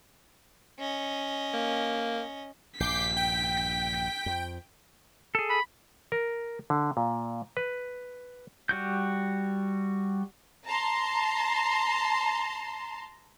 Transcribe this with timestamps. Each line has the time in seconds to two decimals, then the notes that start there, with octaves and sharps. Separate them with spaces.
0.79 C#4 D#5
1.54 A#3
2.80 A#1 G2 D6 G6 B6 C7
3.17 G5
4.26 F2
5.35 G#4 A4
5.49 B5
6.12 A#4
6.70 D3
6.97 A#2
7.57 B4
8.69 G3 F#4 G6
10.66 A5 A#5 C6